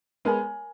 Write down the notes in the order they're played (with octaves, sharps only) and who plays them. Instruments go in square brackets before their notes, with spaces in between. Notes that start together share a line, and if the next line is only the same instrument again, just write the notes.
[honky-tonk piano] G#3 B3 [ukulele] A#4 C#5 G#5 B5